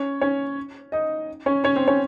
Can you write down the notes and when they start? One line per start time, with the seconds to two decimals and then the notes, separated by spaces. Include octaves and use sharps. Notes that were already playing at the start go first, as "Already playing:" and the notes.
Already playing: C#4 C#5
0.21 C#4 C#5
0.92 D#4 D#5
1.46 C#4 C#5
1.64 C#4 C#5
1.76 C4 C5
1.88 C#4 C#5